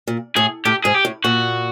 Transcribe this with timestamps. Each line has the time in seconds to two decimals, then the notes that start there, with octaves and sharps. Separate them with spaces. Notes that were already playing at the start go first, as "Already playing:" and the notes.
0.07 A#2
0.36 A2 G#4
0.65 A2 G4
0.84 G#2 G#4
0.94 G4
1.05 A2
1.24 A#2 F#4